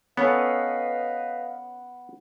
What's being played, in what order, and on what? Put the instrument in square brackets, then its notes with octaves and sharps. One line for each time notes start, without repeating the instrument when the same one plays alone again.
[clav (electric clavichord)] B3 [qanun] C#4 A4 [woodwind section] B4 D#5 F5 [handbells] F#5 B5